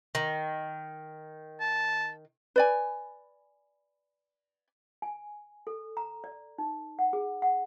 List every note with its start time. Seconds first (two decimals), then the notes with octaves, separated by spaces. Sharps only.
0.15 D#3
1.60 A5
2.56 B4 D5 G#5
5.02 G#5
5.67 A4
5.97 A#5
6.24 D5
6.58 D#4
6.99 F#5
7.13 G#4
7.42 F#5